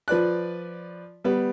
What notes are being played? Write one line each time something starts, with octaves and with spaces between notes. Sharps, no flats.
F3 B4 D5 F#6
G3 B3